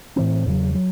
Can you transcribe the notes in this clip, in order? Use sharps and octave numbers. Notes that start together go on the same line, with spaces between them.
A2 E3 C4
E2 C#3 F#3
F#3